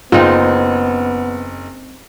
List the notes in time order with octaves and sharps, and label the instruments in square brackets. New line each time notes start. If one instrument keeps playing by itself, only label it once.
[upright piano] F#1 [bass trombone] B3 [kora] C4 D#4 [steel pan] F4